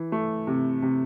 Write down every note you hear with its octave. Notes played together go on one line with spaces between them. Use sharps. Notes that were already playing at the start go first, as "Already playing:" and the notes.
Already playing: E3
A3
C3
C3